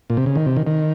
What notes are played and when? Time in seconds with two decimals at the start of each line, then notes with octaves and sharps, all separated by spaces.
0.10 A#2
0.17 C3
0.26 C#3
0.35 D#3
0.46 C3
0.57 D#3
0.67 D#3